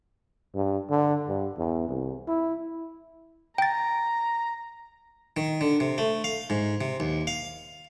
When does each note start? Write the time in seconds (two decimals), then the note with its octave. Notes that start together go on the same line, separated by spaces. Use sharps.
0.54 G2
0.90 D3
1.28 G2
1.58 E2
1.88 C2
2.27 E4
3.58 G5 A#5 A6
5.37 D#3
5.61 D3
5.80 C3
5.98 A3
6.24 F5
6.50 G#2
6.81 C3
7.00 D#2
7.27 F5